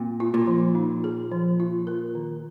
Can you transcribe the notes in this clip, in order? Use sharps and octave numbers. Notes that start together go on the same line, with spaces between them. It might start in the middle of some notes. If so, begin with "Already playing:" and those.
Already playing: A#2 C4
F4
A#2
F3
D#4
G#4
F3
F4
A#4
D#3